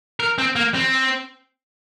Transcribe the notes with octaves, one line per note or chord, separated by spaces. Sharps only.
A#4
C4
A#3
C4